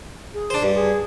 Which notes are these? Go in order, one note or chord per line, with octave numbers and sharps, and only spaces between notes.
G#4
D4 C5
G2 G4
G#4